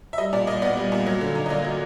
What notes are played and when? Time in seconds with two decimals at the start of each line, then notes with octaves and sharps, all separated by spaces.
0.13 E5
0.18 G3 D#5
0.33 A#2 D5
0.47 A#2 D#5
0.62 B3 D5
0.77 G3
0.92 A#2
1.07 F#3
1.21 D3
1.35 D#4
1.46 D#5
1.50 A#3 D5
1.65 F#3